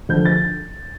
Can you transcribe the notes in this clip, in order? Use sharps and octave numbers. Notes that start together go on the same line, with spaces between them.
D2 D3 F3 D4 G6
A6